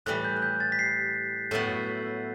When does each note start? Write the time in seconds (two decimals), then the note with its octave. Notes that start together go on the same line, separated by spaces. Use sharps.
0.06 A2 E3 G3 F#6
0.24 G6
0.37 F#6
0.42 G6
0.60 A6
0.72 B6
0.79 C7
1.51 A2 F#3 B3 E4